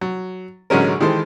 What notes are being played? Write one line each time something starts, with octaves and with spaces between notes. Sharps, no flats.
F#3
A1 D3 F#3 G#3 C#4 A#4
D#3 E3 G#3 G4 A4 C5